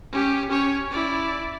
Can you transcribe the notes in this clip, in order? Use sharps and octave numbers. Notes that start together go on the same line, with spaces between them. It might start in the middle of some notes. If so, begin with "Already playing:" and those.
C#4 G4
C#4 C#5
E4 D5